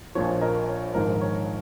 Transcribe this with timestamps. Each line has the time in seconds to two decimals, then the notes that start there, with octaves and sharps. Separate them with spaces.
0.15 A#1 A#2 F3 C#5
0.41 A#4 D#5
0.69 C#5
0.94 A#1 G#2 D#3 A#4
1.21 C#5